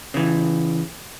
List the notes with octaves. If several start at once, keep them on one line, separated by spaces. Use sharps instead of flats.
C#3 E3